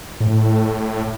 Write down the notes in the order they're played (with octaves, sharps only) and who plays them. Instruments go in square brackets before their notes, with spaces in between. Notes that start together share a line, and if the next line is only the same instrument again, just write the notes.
[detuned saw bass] A2